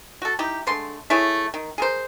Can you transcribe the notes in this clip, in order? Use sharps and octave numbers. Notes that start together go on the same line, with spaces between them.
F#4 A4
D#4 E4 G4
D3 G#3 A3 C6
A3 E4 G#4 C#5
D#3
G#4 A#4 C5